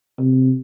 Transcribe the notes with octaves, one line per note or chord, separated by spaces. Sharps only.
C3